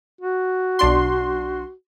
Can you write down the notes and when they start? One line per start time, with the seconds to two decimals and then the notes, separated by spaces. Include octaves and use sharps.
0.21 F#4
0.79 B1 D4 C6